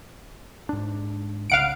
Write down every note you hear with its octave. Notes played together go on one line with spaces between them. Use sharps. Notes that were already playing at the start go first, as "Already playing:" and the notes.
G#2 D4
C2 C#3 F5 F#5 D7